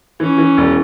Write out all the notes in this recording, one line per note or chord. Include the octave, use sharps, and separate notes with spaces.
E3 C#4
E3
E1